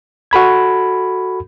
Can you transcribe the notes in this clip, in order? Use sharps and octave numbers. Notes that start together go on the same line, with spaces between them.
F#4 A4 B5 G#6